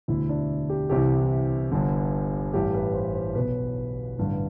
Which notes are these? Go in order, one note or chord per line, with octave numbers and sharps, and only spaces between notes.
E1 D2 D3 E4
D4
G4
C2 C3 E3 G4
G1 G2 D3
A1 G2 E3 G4
B4
C5
C5
B1 B2 B4
A1 G2 D3